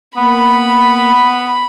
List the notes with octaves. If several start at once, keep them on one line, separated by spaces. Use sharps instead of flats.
A#3 B3 B5